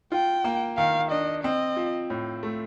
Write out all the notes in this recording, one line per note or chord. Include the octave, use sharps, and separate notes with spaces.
F4 G5
A#3
D#3 F5
D4 D#5
C4 D#5
F3
A2
A3